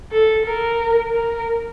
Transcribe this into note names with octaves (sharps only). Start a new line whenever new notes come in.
A4
A#4
A#4